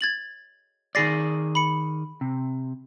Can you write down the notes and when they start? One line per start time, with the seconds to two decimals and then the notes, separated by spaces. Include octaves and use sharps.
0.01 G#6 A6 F#7
0.95 D#3 G#4 D5 A6 A#6 C7
1.55 B5 C#7
2.21 C3